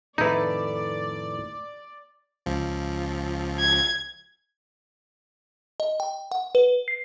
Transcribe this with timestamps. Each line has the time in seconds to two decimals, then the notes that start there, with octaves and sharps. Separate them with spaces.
0.18 F2 A2 D#3 D#4 E4 A4 B4 D5
2.46 C#2 F3
3.60 G#6
5.80 D#5
6.00 G5
6.32 F#5
6.55 B4
6.88 C7